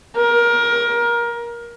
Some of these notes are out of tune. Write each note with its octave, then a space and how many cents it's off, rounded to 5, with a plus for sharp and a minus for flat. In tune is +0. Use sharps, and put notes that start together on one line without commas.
A#4 +20